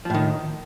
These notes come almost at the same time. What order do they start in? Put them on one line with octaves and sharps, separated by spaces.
F3 A2 D#3